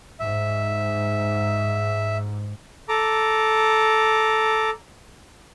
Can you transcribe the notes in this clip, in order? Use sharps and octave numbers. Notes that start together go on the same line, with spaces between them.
G#2 E5
A4 A#5 D6